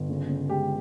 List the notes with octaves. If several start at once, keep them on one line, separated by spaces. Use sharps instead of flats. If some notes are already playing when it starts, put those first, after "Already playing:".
Already playing: G1
C#3
C#3
G#3 G4